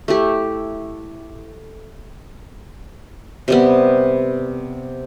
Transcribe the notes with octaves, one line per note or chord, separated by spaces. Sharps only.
A3 E4 G4
C3 G3 B3